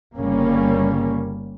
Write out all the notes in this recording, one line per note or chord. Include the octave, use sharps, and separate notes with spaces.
G1 C#3 G3 A#3 C#4